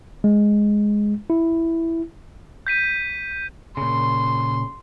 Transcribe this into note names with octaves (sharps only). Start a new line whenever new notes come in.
G#3
E4
G6 B6 D#7
A#2 C#3 C6